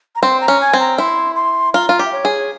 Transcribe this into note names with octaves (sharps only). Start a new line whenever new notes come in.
A#5
C4 C6
A#5
C#4
G#5
C4
A#5
E4 C6
C6
F4 A#5
F4
G4
E5
C#5
G#4